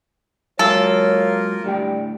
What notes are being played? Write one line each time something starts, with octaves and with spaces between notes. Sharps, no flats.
F#3 G#3 A#3 F4 A4 A#4 C#5
A2 D3 G3 G5